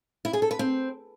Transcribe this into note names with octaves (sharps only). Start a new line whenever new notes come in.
E4
G#4
A4
B4
C4